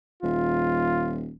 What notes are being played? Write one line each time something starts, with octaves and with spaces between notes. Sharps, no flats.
D#1 F4